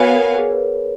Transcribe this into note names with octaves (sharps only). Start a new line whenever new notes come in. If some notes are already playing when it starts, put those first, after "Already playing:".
Already playing: B3 F#4 A#4 B4 C#5 F5 G#5
A#4
G#4
B4
A#4